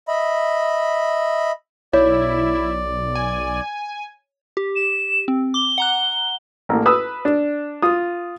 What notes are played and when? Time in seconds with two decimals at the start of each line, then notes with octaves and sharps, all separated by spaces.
0.08 D#5 E5 B5
1.93 B1 E4 C#5 D5
3.15 G#5
4.57 G4
4.75 E7
5.28 C4
5.54 D6 G7
5.78 F#5 A#5 F#6
6.69 A1 A#3
6.86 B4 D#6 E6
7.25 D4
7.82 F4 D#6